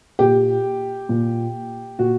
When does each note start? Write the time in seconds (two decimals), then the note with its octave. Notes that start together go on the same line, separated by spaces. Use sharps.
0.19 A#2 G4
1.09 A#2
1.99 A#2 F#4